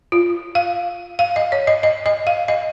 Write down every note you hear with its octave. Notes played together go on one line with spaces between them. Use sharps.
F4
F5
F5
D#5
C#5
D#5
D#5
D#5
F5
D#5